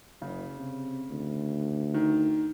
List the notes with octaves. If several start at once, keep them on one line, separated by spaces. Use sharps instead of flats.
F#1 C#3
C3
D2
D#3